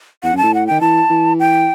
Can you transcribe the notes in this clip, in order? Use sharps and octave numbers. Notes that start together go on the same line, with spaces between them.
E2 F#5
F#2
A5
A2
F#5
D#3 G5
E3 A5
E3
G5